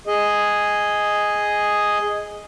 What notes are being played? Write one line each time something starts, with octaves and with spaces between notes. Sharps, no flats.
G#4 D#5